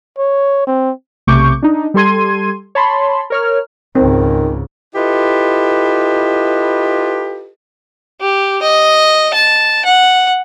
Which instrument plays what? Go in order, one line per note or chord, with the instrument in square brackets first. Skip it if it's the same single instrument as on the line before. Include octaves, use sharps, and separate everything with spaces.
[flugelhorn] C#5
C4
[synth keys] B1 C3 A3 C#6 D6 G6
D4 D#4
G3 G4 A4 C6 G#6 D#7
C#5 A5 B5 C6
A#4 C#5 F6
[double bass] C#2 G#2 [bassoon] D#3 [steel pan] C4
[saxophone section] E4 F4 G4 A4 B4 D#5
[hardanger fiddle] G4
D#5
A5
F#5